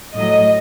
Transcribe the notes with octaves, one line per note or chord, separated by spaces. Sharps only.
A2 F#3 D#5